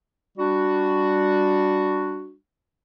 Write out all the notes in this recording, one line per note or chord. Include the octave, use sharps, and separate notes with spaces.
G3 D4 F#4